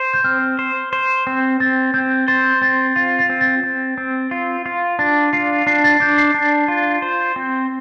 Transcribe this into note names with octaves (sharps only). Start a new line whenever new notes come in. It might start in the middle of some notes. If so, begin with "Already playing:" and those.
Already playing: C5
G6
C4 F6
C5
C5
C4
C4 A6
C4 G6
C5 A6
C4 A6
F4 A6
A6
C4
A6
C4
C4
F4
F4
D4 A6
F4 C7
D4 C7
A6
D4 G6
C7
D4
F4
C5
C4